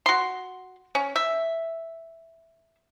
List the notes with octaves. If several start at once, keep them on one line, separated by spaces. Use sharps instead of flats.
F#4 C6
C#4
E5